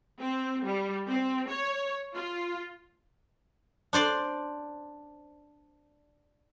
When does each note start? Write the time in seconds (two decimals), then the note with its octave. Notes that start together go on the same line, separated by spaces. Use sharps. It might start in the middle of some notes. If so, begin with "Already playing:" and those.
0.18 C4
0.62 G3
1.07 C4
1.48 C#5
2.15 F4
3.93 D4 C5 D5 C6